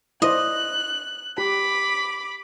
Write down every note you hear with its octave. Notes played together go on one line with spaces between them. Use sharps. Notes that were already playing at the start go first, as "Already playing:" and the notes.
E4 C5 D5 D#5 F#6
G4 B5 D6